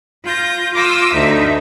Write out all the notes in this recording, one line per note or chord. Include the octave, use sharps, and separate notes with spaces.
F4 G6 A#6
F4 C6 D6 E6 A#6
D2 D#4 E5